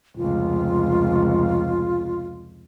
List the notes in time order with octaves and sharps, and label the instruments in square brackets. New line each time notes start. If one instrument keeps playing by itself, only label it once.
[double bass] F1 C#2 [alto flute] F4